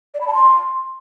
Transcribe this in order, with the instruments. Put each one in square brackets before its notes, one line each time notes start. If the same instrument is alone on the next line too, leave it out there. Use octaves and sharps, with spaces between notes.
[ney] D5
B5
A5
C6